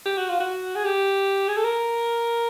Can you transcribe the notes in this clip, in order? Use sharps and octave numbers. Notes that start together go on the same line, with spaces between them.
G4
F#4
F4
F#4
G#4
G4
G#4
A4
A#4